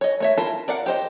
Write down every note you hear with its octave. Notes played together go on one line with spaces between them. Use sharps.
C#5 D#5
A3 C#5 E5
E4 F4 A#4 A5
A#4 D5 F5 F#5
G4 C5 D#5